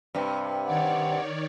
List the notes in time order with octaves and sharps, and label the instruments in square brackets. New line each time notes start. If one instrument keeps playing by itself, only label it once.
[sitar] G2 C3
[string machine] D#3 C#5 D5 [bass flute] F#5